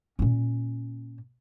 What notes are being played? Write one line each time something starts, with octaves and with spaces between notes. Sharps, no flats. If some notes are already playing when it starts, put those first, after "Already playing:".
A#2 C#4